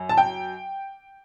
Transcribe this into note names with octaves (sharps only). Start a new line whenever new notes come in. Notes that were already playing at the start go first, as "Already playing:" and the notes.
Already playing: F#2
A5
G5